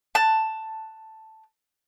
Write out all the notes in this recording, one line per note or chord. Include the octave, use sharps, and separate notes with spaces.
A5 F#6